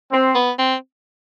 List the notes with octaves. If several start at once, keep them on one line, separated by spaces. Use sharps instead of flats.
C4
B3
C4